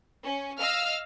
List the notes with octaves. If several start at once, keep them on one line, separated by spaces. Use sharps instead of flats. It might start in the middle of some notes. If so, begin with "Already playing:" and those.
C#4
D#5 F5 E6 F6